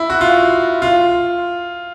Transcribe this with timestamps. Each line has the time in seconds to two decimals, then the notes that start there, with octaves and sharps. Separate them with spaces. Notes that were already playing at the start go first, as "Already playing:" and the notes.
Already playing: E4
0.10 F#4
0.21 F4
0.82 F4